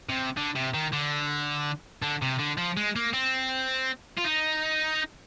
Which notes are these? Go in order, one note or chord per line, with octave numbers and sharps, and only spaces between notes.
C3
D3
C3
D#3
D3
D3
C3
D3
F3
G#3
A#3
C4
F4
D#4